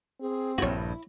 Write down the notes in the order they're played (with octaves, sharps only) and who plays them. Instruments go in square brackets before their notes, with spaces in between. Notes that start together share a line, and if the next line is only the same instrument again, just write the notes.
[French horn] C4 [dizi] G#4
[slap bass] A#1 G2 [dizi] E4 [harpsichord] F#4 C#5